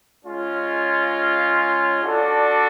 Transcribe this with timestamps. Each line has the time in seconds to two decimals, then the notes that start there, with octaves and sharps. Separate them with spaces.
0.24 G#3 C#4 F4
2.03 D4 F#4 A4 D5